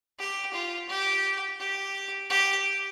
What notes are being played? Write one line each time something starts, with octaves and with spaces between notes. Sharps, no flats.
G4
F4
G4
G4
G4